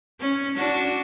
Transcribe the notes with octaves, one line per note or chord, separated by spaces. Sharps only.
C#4
D4 F#4